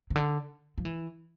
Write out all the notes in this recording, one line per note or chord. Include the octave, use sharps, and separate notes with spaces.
C#3
D3
F3
E3